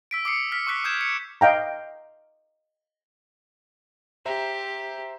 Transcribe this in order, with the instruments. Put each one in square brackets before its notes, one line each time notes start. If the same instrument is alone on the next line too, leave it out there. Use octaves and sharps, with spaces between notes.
[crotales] E6 B6 D7
D6 D#6 C7 C#7
F6 B6
C#6 D6 F#6 B6 C#7
D#6 G6 G#6 E7
C#7
[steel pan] D#5 F5 G5 A#5
[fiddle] G4 [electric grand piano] C5 E5 A#5